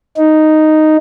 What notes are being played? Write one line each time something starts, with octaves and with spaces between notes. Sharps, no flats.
D#4